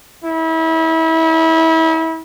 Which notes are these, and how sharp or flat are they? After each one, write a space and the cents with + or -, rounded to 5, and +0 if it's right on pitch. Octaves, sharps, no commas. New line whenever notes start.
E4 -30